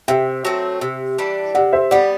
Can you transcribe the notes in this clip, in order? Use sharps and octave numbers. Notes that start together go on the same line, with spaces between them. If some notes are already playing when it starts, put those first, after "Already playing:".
C3 E5 G5
F#3 A3 C4
C3
E3 G3 D4
C3 D5 F#5
C5 E5
G3 B3 D5 F#5